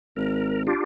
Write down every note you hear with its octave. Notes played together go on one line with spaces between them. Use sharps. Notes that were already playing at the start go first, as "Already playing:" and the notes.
G#1 A#4
D4 F4 G4